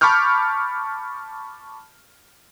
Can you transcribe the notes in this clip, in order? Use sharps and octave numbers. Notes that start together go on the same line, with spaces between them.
A5 B5 C#6 D6 F6 G6